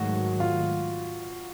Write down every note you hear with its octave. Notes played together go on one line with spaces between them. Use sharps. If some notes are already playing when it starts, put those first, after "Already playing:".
Already playing: G#2 D#3 F#3 A3 F#4
F4